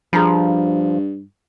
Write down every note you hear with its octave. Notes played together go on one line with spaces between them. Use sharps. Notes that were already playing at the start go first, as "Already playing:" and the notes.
G2 F3 G#4 A#5 B5